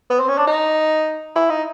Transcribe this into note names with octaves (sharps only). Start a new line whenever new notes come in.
B3
C4
C#4
D4
D#4
E4
D#4